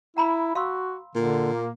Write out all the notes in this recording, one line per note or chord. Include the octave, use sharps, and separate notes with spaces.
E4 F#5 A#5 B5
F#4 F5 C6 E6
A#2 D3
A#3